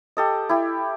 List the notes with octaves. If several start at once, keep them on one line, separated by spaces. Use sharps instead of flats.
G4 A4 D#5
E4 G4